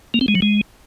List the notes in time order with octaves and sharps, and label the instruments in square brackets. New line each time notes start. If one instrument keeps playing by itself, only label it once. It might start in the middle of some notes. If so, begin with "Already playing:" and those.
[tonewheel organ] A#3
C4
G#3
F#3
G#3